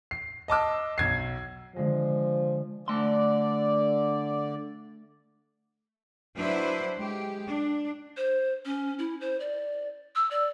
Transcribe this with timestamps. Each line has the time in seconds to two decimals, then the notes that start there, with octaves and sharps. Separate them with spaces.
0.11 C7
0.48 D#5 A5 D6 E6
0.98 B1 G#6 C7
1.76 D3 F3 G#3
2.88 D3 A3 D5 C6
6.36 F#3 D4 E4 B4 C5
6.96 G#3 G4
7.48 D4
8.17 C5
8.65 C#4
8.99 E4
9.21 C5
9.40 D5
10.15 E6
10.31 D5